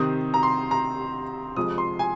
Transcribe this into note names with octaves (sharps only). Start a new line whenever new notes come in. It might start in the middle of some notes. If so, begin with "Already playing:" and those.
Already playing: C3 D#3 C4 D#6
A#5
C6
A#5
F2 C3 F3 G#3 D#6
C6
G#5